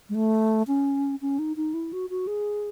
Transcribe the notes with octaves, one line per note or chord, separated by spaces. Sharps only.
G#3
A3
C#4
C#4
D#4
D#4
E4
F#4
F#4
G#4